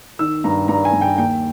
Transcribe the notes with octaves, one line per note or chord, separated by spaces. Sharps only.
D#3 E6
G2 A#5
G2 A#5
G#5
G2
G5
D#2 G5